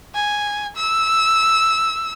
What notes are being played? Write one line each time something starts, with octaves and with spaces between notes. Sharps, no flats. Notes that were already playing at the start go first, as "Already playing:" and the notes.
G#5
E6